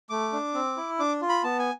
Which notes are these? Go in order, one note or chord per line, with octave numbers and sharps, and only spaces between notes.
A3 D6
D4
C4
E4
D4 D6
F4
B5
B3 A5
G#5